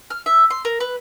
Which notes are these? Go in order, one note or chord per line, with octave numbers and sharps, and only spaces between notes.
F6
E5
C6
A#4
B4